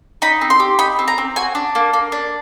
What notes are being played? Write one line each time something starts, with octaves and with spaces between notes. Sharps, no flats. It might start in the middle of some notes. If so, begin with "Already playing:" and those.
D#4 B5
C4
C6
G4
D#4 B5
C4
A#5
C4
F#4 G#5
D4
A#3
A#3
D4